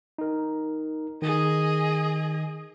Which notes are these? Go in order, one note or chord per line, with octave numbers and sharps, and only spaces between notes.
D#4 A#4
D#3 G#4 D#5